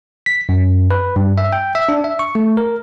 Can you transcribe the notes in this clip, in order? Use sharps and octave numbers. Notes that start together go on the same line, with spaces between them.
B6
F#2
B4
G2
E5
G5
E5
D4
E5
C#6
A3
A#4